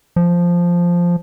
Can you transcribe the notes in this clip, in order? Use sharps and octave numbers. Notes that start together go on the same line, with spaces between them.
F3